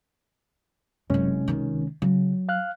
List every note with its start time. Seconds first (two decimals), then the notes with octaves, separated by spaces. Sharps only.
1.10 F#1 F#2 C3 G#3 C#4
1.48 C#2 D#3
2.02 C#3 F#3
2.49 F5 F6 F#6